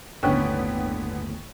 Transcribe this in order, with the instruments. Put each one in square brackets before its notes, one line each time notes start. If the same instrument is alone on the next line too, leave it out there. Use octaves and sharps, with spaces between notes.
[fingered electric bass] G1 D#2 A2 [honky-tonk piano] D3 B3 [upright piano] C#4 G5 F#6